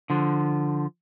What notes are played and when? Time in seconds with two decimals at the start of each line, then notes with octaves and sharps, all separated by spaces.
0.10 D3 F3